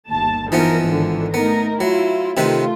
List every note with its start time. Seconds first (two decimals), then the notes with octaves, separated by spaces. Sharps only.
0.11 G1 D#2 A5
0.52 E3 F3 B3 D#4 A#4
0.85 G#1 D3 D#3
1.34 A3 B3 D#4 A#4
1.81 F#3 E4 F4
2.37 C3 D#3 A3 F4 B4